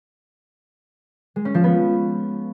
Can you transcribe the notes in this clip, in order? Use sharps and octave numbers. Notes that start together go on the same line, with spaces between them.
G#3
C#4
F3
B3